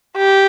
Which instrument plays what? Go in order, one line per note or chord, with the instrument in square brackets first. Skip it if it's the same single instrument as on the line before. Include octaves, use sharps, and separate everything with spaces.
[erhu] G4